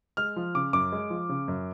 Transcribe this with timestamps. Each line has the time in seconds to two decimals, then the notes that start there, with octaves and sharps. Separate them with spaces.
0.17 G#3 F6
0.36 F3
0.55 C#3 D6
0.73 F#2 D6
0.92 G#3
1.10 F3
1.29 C#3
1.48 F#2